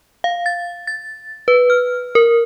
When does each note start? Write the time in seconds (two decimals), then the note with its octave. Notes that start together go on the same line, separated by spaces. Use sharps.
0.24 F5
0.46 A6
0.87 A6
1.48 B4
1.70 F6
2.15 A#4